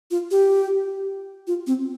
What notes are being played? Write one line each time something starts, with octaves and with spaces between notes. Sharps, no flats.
F4
G4
F4
C4